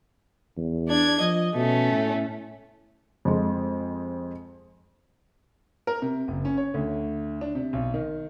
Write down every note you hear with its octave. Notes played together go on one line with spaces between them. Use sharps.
E2
D4 G#6
F3 D#5
B2 A3 C#4
A2
F2 G#3
A#4
C3
F#1
C#4
C#5
D2
D4
C3
B1
D#3